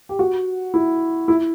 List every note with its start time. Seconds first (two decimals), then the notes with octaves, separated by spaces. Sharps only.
0.09 G4
0.19 F#4
0.74 E4
1.28 E4